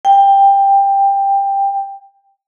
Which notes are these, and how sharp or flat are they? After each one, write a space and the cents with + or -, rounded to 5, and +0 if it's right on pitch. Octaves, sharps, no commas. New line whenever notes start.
G5 +15